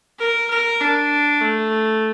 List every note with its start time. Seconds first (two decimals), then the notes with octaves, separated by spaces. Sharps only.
0.19 A#4
0.50 A#4
0.81 D4
1.41 A3